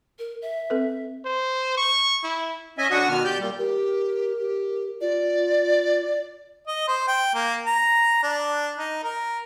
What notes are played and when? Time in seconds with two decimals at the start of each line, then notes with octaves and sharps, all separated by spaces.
0.19 A#4
0.42 E5
0.70 C4 A4 B4
1.25 C5
1.77 C#6
2.24 E4
2.78 C#4 D#5 E5 G#5
2.91 D3 D4 F#4 F#5 C#6 D#6
3.09 B2 D#3 B3 F6
3.24 G4 D5 G6
3.39 A#2 G3
3.58 G4 A#4
4.38 G4
5.01 F4 D5
6.67 D#5
6.88 C5
7.08 G5
7.35 A#3
7.66 A#5
8.23 D4
8.78 D#4
9.03 A#4